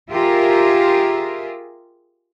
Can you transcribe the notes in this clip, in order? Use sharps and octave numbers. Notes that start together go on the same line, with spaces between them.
F4 G4 G#4 A#4 E5